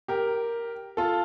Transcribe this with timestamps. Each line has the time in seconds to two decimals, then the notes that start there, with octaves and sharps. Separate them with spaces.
0.08 G4 A#4
0.97 F4 A4